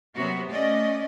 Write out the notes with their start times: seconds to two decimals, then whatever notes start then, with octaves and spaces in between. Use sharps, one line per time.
0.15 C3 F#3 A#3 B3 F#4
0.49 A3 C#4 D5 D#5